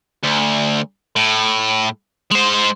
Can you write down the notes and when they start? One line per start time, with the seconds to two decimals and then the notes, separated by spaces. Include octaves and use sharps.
0.24 D2
1.16 A2
2.31 G#3 C5